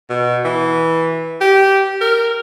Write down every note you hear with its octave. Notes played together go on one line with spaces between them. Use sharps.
B2
E3
G4
A#4